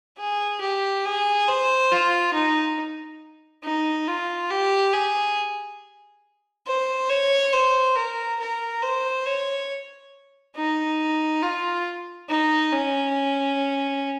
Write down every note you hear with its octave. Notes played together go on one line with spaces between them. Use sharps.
G#4
G4
G#4
C5
F4
D#4
D#4
F4
G4
G#4
C5
C#5
C5
A#4
A#4
C5
C#5
D#4
F4
D#4
C#4